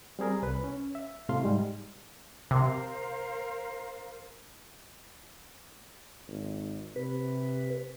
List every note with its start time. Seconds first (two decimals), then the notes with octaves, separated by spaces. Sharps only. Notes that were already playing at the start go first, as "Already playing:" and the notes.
0.19 G3 C4 G#4 A#4
0.43 C2 B4
0.64 C#4
0.95 E5
1.29 A2 C3 A3 F5 C6
1.44 G#2 G3 G#3
2.51 C3 A#4 C5 F5
6.28 G#1
6.96 C3 B4